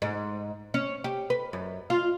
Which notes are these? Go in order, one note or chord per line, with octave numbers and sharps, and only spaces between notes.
G#2
C#4
G4
B4
F#2
F4